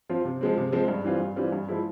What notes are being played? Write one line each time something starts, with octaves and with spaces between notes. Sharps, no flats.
F3 C4 F4
C3
F3 G#3 C4
C3
F3 G#3 C4
G2
E3 G3 C4 F4
G2
E3 G3 C4 F4
G2
F3 G#3 E4